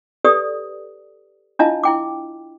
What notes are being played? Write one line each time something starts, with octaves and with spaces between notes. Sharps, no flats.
G4 A4 B4 D5 D#6
D4 E4 F4 D#5 F5 A5
E4 G5 D6